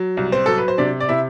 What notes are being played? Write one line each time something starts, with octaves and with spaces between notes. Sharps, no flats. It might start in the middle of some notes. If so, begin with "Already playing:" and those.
Already playing: F#3
C2
C4 C5
F#3 A4
B4
C5
C3 D4 D5
D5
C3 E4 E5